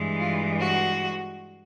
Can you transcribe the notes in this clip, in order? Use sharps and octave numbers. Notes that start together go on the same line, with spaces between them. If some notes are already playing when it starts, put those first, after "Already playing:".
Already playing: G2 E3 G#3
F4
F#4